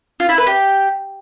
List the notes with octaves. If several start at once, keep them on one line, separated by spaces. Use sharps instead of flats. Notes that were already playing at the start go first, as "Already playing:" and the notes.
F4
E4
B4
G4